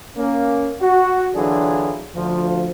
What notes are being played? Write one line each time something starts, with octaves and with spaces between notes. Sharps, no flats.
A#3 C#4
F#4
D3 E3 F#3 D4 F4 G#4
D2 F3